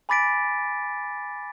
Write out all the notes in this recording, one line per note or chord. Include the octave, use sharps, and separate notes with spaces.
G#5 B5 D6 A6 B6 D7